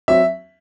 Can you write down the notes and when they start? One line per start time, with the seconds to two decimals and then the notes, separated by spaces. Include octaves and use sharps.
0.08 F#3 C4 E5